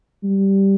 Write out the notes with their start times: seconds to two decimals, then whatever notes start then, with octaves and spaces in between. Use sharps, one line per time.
0.23 G3